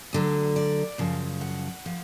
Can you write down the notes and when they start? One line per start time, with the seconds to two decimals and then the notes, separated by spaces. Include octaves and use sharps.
0.13 D2 D3 F#3
0.56 D5
0.98 F#2 C#3 F3
1.41 F#5
1.86 F3